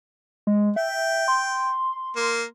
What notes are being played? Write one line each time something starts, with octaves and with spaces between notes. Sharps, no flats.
G#3
E5 G5
C6
A#3